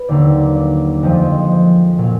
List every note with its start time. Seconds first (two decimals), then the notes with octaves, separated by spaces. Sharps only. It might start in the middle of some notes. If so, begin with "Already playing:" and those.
Already playing: B4
0.08 D#2 D3 F#3 D5
0.56 D5
1.03 F2 F3 G#3
1.98 A#2 F#3